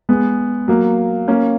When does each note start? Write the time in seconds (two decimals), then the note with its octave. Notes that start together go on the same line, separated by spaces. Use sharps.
0.09 G#3 B3
0.68 F#3 A#3
1.28 A#3 C#4